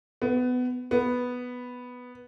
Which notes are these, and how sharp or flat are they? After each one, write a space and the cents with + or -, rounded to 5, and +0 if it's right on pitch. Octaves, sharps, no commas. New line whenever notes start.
B3 +20
B3 +0